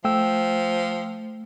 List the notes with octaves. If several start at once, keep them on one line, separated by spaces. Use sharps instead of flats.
F3 A3 G5 E6